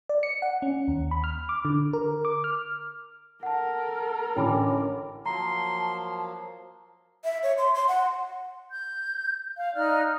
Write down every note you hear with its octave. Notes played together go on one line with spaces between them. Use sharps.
D5
C#7
F#5
C#4
D#2
B5
F6
D6
D3
A#4
D6
F6
A4 A#4 F#5 A5
A1 D3 C#4 G5 B5 D6
F3 F#3 A#3 A5 A#5 C6
E5
C#5
C6
C6
F#5
G6
F5
D#4 D5 F6 F#6